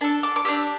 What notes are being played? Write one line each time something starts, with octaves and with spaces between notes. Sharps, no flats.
D4 A4 A5
D6
D6
D4 G4 E6